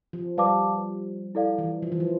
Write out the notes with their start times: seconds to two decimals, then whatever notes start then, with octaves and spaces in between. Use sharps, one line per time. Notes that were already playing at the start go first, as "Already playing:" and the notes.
0.13 F3
0.38 G3 B4 D5 F5 A5 D6
1.35 E4 A4 D5 F5
1.58 E3
1.83 F3
1.92 E3
2.00 F3